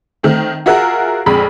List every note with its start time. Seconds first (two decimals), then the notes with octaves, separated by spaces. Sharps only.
0.23 D#3 A3 C4
0.66 F4 F#4 G#4 A#4 E5 F#5
1.26 A#1 F2 G#3 B5